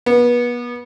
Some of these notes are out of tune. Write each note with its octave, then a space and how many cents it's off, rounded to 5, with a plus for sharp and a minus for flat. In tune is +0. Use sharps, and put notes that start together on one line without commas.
B3 -30